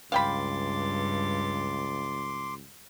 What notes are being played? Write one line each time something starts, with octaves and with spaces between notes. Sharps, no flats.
C#2 G2 F5 G5 B5 C6 D6 A6